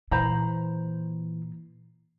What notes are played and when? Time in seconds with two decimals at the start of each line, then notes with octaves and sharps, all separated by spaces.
0.11 A#2 E3 C5 A#5 B5